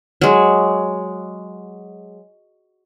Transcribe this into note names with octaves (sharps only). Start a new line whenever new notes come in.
F#3 G#3